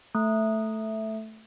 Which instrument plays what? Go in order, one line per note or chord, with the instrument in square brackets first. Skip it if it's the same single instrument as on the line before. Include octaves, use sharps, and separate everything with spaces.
[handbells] A3